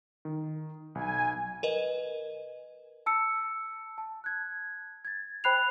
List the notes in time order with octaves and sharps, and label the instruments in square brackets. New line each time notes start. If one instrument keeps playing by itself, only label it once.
[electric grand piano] D#3
[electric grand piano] B1 [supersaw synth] G#5
[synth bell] A#4 B4 D#5
[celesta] A5 E6 C#7
A5
F#6 G#6
G#6 A6
C5 G5 B5 F#6 C7 F7